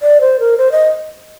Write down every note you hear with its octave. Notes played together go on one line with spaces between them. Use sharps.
D5
C5
A#4
C5
D#5